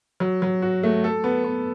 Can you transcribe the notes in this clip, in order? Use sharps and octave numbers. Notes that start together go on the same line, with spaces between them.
F#3
F#3
F#4
A3
A4
B3
B3